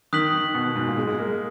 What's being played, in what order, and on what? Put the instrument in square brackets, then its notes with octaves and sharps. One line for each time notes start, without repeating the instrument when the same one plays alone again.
[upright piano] D#3 [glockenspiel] D#6 F#6 B6 F#7
[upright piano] D#3
B2
B2
G#2
A#2
G#3
G#3
A#3
G#3